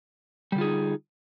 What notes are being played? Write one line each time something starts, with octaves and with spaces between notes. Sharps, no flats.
D3 G3 D#4 F4 G#4